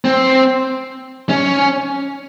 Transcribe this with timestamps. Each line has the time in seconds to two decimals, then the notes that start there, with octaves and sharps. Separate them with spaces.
0.05 C4
1.29 C#4